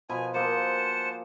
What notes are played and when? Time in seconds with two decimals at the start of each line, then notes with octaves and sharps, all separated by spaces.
0.09 B2 F3 G#5 B5
0.34 A#3 G#4 C5 F#5 A5